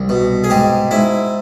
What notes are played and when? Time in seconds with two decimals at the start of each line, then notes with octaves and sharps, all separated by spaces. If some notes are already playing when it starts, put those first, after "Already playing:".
Already playing: C2
0.09 B2
0.44 G#4
0.50 G#2 G4
0.91 G#2 E4